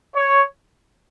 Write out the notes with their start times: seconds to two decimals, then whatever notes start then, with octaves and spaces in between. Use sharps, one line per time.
0.15 C#5